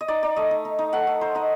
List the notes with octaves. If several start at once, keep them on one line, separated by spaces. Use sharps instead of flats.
D#5
D#4 D5
D#4 D5
A3 D#5
D#4
D#4
D#4
A3 F#5
A3
D#4 C5
D#4 D#5